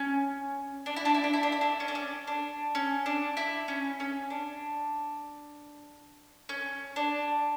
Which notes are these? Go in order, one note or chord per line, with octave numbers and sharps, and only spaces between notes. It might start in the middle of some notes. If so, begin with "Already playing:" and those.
Already playing: C#4
D4
E4
D4
E4
D4
E4
D4
E4
D4
C#4
D4
C#4
D4
C#4
D4
E4
C#4
C#4
D4
C#4
D4